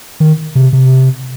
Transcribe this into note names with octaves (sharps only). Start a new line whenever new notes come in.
D#3
C3
C3